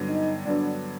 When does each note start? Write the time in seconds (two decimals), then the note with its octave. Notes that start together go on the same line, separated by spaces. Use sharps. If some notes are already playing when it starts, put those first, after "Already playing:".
Already playing: G2 D3 F#3 B3
0.09 D#4
0.45 G2 D3 F#3 B3 D4